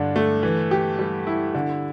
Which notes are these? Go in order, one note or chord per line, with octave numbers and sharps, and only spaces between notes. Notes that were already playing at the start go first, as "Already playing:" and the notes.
Already playing: G2 D3 D4
A3
E3
G4
G3
E4
D3